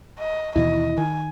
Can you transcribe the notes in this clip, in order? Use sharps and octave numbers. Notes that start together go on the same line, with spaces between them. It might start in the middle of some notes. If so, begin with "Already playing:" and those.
D#5
D#2 B2 E3 E4 D#5
D#3 G#5